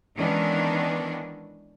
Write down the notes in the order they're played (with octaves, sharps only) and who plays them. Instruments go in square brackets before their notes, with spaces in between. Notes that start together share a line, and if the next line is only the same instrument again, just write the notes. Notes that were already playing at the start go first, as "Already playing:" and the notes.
[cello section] D#3 E3 G#3 B3 C#4 D4